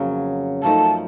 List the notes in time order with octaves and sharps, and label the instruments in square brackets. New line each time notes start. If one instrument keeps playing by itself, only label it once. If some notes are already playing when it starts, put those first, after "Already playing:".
Already playing: [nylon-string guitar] F2 C#3 F#3 A#3 C#4
[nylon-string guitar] F#2 F3 A3 D#4 [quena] A5